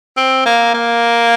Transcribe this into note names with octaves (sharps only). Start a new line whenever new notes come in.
C4
A#3
A#3